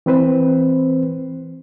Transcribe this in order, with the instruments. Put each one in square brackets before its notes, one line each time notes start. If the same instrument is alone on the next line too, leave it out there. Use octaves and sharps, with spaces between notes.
[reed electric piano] E3 C4 B4 C5